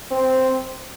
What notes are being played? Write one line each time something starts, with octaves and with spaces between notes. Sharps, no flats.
C4